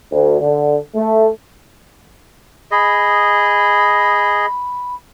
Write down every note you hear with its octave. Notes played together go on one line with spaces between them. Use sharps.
D2
D3
A3
G#4 D#5 B5